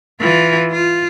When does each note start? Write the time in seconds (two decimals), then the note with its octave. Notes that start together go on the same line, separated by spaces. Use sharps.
0.21 E3 F4
0.71 F4